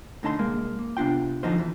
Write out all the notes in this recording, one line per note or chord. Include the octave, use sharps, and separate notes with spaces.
A2 D3 D#4 A5 A#5 C6
C2 G#3 A#3
A#3
C3 B3 D4 F4 G5
D3 F3 F#3 D#4 F4 C5
E2 E3